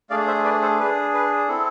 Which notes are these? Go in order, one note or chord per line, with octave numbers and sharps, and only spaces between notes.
A3 D4 G#4 D5 F5
C5 E5
B4 D5
A4 C5
D4 G#4 B4
B4
C4 E4 A4